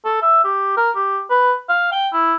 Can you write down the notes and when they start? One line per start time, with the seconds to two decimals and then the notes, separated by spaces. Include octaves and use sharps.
0.05 A4
0.22 E5
0.45 G4
0.77 A#4
0.96 G4
1.30 B4
1.69 F5
1.92 G5
2.13 E4